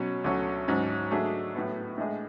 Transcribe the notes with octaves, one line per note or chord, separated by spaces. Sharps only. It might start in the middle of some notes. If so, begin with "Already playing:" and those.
Already playing: B2 F#3 C#4
D2 D3 F#3 C#4
G#2 F#3 C#4
F#3 A3 D4 G#4
A2 F#3 B3
A2 G#3 D4 G#4